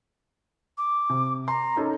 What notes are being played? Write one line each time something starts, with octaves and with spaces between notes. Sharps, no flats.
D6
C3
A#5 C6
C#4 D#4 A4